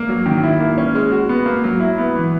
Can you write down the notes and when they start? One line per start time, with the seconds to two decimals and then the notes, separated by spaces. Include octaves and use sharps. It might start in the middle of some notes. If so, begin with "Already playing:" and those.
Already playing: A#3
0.09 F#3
0.26 D#3
0.43 E4
0.60 A#3
0.78 C#4
0.95 G#3
1.12 F#4
1.29 B3
1.46 A#3
1.64 F#3
1.80 E4
1.98 B3
2.15 E3